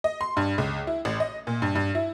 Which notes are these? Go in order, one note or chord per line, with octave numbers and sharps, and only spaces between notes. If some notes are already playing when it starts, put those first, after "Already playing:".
D#5
C6
G2
C#2
E4
A1
D#5
A#2
G2
G2
E4